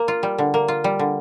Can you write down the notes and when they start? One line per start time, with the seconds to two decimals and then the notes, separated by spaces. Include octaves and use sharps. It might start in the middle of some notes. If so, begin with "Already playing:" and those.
Already playing: A#3
0.08 F4
0.23 G3
0.38 D3
0.54 A#3
0.68 F4
0.84 G3
0.99 D3